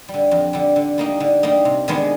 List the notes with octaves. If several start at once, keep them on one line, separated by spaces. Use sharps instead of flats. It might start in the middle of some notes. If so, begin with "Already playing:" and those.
G3
D3
F2
D3 G3
D3
G3 A#3 D#4
D3
G3 A#3 D#4
C3
D#3 G#3 B3 D4